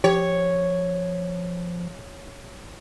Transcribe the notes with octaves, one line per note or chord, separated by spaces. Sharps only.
F3 G4 C#5